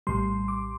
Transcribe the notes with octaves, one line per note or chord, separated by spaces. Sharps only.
A#1 A2 G3 C6
D6